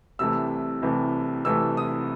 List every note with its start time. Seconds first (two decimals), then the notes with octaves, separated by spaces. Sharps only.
0.19 C2 C3 E3 A3 E6
0.82 C2 C3 E3 A3
1.45 C2 C3 E3 A3 E6
1.77 D#6